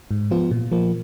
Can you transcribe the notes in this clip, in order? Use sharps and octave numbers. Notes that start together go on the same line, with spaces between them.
G#2
F3 B3 F4
A#2
F3 A#3